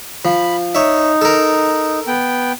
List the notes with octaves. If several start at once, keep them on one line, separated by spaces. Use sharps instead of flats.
F3 B5
D#4 C#5 E5
A4 A#4
B3 G5